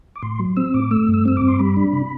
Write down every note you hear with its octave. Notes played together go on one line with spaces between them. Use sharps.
D6
A2 C6
F#3
C4 E6
A2 D6
A3 E6
G2
E6
C4 E6
G2 D6
C6
G3 B5
D4
C3